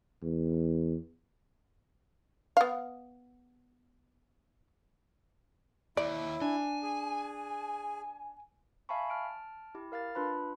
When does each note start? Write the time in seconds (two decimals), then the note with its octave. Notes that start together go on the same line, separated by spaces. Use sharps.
0.22 E2
2.57 B3 F5
5.97 D#2 E4 D5
6.41 D4 G#5
6.83 G#4
8.89 E5 F5 G#5 A5 B5 C#6
9.10 A5 F6 D7
9.75 E4 G4
9.92 A#4 F5 F6 A6
10.15 D4 F4 B4 B5